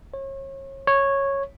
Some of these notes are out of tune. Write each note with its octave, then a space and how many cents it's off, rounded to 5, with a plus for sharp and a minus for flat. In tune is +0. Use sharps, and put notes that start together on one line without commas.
C#5 -35
C#5 -10